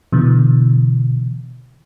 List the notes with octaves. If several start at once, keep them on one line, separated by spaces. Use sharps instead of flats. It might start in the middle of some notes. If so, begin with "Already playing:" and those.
B2 D3 E3